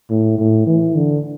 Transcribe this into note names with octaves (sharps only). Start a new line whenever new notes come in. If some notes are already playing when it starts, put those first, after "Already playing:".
A2
A2
E3
D3